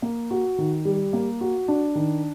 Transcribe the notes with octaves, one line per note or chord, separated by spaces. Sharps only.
A#3
F#4
D#3
G3
A#3
F#4
D4
D#3